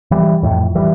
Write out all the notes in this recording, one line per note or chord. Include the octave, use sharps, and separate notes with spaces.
E3 G3
F2 A2
E3 G3